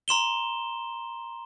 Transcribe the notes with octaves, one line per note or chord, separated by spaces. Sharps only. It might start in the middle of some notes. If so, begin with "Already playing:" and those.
A#5 C6 E7 G7